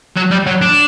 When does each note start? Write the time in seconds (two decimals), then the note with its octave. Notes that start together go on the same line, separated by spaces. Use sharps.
0.16 F#3
0.31 G3
0.46 F#3
0.62 D4